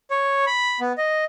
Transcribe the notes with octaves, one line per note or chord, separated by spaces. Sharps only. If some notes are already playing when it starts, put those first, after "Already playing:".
C#5
B5
B3
D#5